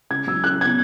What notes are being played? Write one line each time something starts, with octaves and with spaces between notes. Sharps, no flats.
C#3 G#6
F#3 E6
C#3 F#6
B3 G#6